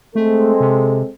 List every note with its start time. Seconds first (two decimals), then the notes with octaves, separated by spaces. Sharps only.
0.15 G#3 A3 C4 A4
0.60 C3